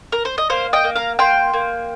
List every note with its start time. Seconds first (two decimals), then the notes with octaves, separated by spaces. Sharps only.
0.12 A#4
0.25 C5
0.38 D#5
0.50 A#3 C5 F5
0.73 D#5 G5
0.84 A#3
0.95 F5 A#5
1.19 A#3 G5 C6
1.54 A#3